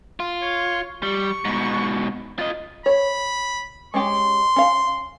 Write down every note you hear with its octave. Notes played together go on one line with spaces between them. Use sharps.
F4
C#5
G3 C#6
G#2 B2
F4 D#5
C#5 B5
G#3 C#4 G4 C6
C#4 F5